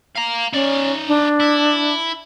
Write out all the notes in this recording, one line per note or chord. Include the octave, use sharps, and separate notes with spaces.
F5 A#5
C#4 D#4 D5
D4
E4